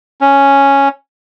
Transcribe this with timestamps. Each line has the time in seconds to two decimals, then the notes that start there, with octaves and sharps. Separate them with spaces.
0.21 C#4